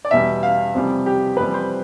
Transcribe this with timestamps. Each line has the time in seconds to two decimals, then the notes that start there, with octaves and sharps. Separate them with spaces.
0.05 D5
0.11 E2 B2 G3 E5
0.43 F5
0.74 F2 C3 E3 G3
1.06 G4
1.37 F2 E3 G3 B4
1.54 C5